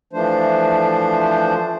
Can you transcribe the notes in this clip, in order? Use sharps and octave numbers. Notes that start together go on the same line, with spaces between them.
E3 F3 A3 D4 C5